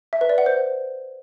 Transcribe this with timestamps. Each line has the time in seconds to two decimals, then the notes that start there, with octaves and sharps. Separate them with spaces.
0.13 E5
0.21 B4
0.30 D5
0.38 F#5
0.46 C5